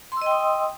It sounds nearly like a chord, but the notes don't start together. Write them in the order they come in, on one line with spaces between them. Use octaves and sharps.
C6 E6 D#5 G5 D#6